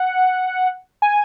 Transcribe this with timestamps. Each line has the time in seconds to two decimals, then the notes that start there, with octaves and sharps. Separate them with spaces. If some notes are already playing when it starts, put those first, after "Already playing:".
Already playing: F#5
1.02 G#5